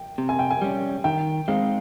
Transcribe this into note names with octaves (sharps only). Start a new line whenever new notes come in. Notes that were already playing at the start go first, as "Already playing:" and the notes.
Already playing: G5
C3
G#5
G5
G#5
G3 C#4
D#3 G5
G#3 C4 D#4 F5